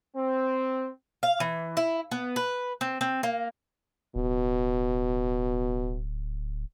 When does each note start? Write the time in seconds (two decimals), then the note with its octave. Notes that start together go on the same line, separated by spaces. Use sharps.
0.15 C4
1.23 F5
1.40 E3
1.77 E4
2.11 B3
2.36 B4
2.81 C4
3.01 C4
3.23 A#3
4.16 D1 B2